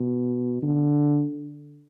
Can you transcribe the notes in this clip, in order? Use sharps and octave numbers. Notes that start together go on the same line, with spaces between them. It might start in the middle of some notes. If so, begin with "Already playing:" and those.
Already playing: B2
D3